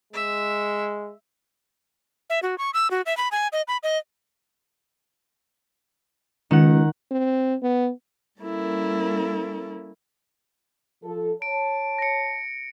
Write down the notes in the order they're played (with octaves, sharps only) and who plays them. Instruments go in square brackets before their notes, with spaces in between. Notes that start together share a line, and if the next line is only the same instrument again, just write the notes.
[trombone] G#3 [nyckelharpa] E5
[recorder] E5
F#4
C#6
E6
F#4
E5
B5
G#5
D#5
B5
D#5
[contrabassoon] C#2 [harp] D#3 F#5
[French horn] C4
B3
[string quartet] G3 A#3 C#4 E4 A4 A#4
[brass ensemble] F3 A4
[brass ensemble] C#5 A5 [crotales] D7
[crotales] A#6 C#7